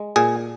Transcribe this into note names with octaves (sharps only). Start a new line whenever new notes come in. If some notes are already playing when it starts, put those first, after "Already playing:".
Already playing: G#3
A#2 G#4